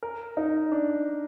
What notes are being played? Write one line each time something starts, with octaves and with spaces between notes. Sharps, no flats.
A#4
D#4
D4